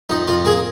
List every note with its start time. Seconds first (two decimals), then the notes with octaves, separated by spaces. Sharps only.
0.10 F2 D#4
0.27 F2 F4
0.45 A#3 G#4